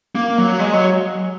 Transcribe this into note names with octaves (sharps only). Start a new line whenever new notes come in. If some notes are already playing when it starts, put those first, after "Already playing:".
A#3
F#3
G#3
F#3